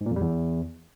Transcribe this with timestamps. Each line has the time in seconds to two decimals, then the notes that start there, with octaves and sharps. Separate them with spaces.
0.01 G#2
0.06 A#2
0.11 F2
0.16 G3
0.21 E2